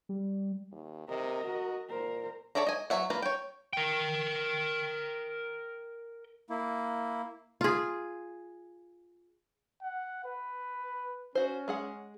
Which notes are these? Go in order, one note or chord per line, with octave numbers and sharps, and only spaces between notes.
G3
D#2
C3 A#4 D#5
F#4
A#2 A#4 C5
A4 C#5 D5 E5 A#5
D#5 G#5
F#3 A#4 C#5 E5 F#5
A#3 F4 B4 A#5
C#5 G5
A#4 G5
A#3 E4
F4 G#4
F#5
B4
C#4 F#4 C5
G#3 G#4 F#5